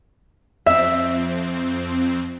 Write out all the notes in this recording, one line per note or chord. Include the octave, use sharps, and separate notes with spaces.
F2 C4 E5